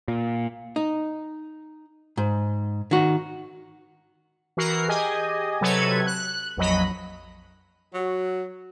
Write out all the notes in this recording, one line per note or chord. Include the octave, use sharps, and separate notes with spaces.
A#2
D#4
G#2
D#3 F#4
E3 F#4 A#4 C7
G4 G#4 D#5 G#5
C3 F#3 A4 B4 C#5 G#6
F#6
A#1 F2 F#3 D#5 B5
F#3 F#4